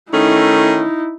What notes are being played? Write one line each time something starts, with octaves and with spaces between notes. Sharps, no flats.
D#3 A3 C#4 D#4 E4